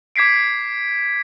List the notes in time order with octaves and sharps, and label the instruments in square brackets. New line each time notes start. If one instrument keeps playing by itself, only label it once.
[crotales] D6 G#6 B6 C7 D7